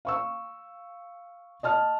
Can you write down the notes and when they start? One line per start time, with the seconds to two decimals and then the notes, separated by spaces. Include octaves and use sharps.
0.05 F5 C#6 E6
1.63 D#5 A5 F6